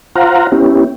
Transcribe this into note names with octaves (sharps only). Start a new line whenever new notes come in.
F4 C5 F5 F#5 A#5
B3 C#4 E4 G4